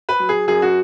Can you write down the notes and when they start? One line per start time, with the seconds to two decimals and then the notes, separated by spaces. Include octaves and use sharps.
0.09 B4
0.20 F#3
0.29 G#4
0.48 F#2 G#4
0.62 F#4